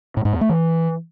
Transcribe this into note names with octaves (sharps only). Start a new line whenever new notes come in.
A2
G#2
E2
A3
E3